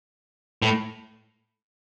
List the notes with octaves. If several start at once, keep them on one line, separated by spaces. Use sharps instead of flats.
A2